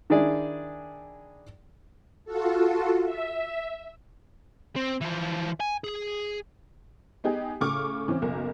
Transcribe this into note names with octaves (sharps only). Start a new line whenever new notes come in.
D#3 D4 E4 G#4 D5
F4 F#4 A4
E5
C4
E3 F3
G#5
G#4
B3 D#4 G4 G#4
A2 C#3 C#6 D6 F6
E3 C4 C#4
F#1 B1 A#4